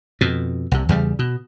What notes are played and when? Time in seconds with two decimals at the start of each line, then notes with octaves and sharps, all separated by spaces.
0.21 F2 B2
0.71 C2 C3
0.89 E2 C#3 G3
1.19 B2